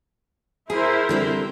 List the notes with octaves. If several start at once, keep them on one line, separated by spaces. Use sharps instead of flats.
E4 G#4 A#4 C5
D3 G3 C4